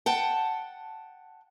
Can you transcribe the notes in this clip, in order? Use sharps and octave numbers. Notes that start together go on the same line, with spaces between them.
F#5 G5 A5